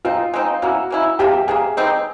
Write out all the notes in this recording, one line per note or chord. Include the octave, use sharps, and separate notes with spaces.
G#3 C4 D#4 F4
G#3 C4 D#4
A#3 C#4 E4 F#4
A#3 C#4 E4
C3 F3 A#3 G4
G4
C3 F3 A#3 G#4
B2 G3 C4 D#4